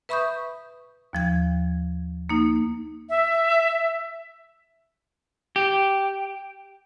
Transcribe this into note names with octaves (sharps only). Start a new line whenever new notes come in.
B4 E5 B5 C#6 D#6 G6
D#2 F3 G#6
A#3 D#4
E5
G4